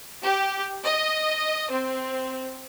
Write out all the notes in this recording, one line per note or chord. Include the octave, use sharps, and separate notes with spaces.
G4
D#5
C4